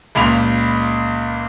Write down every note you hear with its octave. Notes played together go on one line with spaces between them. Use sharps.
C#2 A#2 B5 F7